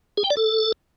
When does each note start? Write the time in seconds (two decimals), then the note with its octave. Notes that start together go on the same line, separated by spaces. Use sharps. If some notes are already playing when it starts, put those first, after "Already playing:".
0.17 G#4
0.24 G5
0.30 D5
0.37 A4